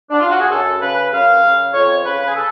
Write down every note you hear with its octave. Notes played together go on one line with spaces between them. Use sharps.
D4
F4
F#4
G#4
F#2 A4
C#3 B4
F#2 F5
C#3
F2 C#5
C#3 B4
G#4
A4